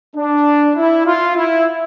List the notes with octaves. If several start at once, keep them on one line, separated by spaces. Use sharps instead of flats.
D4
E4
F4
E4